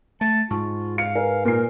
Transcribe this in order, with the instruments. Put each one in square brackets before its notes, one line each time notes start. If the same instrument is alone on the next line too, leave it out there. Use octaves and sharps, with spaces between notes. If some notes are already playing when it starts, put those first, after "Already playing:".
[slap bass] A3 [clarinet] A5
[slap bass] G#2 [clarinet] F4 [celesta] A5 C#6
[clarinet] F5 [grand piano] C#7
[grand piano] A#4 [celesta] B4 G#5
[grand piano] A#2 C7 [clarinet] A#4